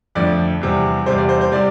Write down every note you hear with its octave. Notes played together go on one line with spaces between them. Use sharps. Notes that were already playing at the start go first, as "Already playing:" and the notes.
F2 D3 F3 A3 D5
E2 C3 G3
E2 C3 G3 C5
D5
C5
C5
C3 G3 D5